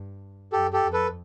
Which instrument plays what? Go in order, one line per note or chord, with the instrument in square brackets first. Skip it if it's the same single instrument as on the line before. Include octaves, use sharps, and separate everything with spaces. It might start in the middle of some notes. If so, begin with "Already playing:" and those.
Already playing: [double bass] G2
[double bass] F#2 [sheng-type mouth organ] G4 A4
[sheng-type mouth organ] G4 A4
[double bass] F2
[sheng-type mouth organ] A4 B4